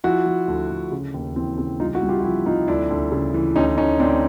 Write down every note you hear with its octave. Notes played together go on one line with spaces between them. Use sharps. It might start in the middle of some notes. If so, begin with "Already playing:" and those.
F3 E4 F#4
F3
D2
D2
C#3
D#2
E3 C4
C#3 C4
C2 D#4 F4
E4 F#4
C2
F4 G4
F4
F3 E4 F#4
C2 D#4 F4
D2 D4 E4
D2
C#3
E3
D2 C#4 D#4
D2 C#4 D#4
D2 C4 D4